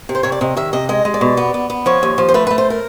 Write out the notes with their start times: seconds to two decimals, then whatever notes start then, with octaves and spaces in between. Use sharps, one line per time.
0.09 C3
0.15 C5
0.23 C3 C#5
0.32 D5
0.41 C3 D#5
0.57 D#3 E5
0.73 C3 D#5
0.89 G#3 D#5
1.05 G#3
1.14 D5
1.21 B2
1.37 B3
1.54 B3
1.70 B3
1.86 F3 C#5
2.03 D#2
2.18 F3
2.29 C5
2.34 A3 B4
2.47 B4
2.51 A3
2.58 C5
2.70 A#4